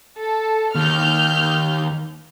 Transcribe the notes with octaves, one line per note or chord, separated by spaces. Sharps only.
A4
D#2 F6 G6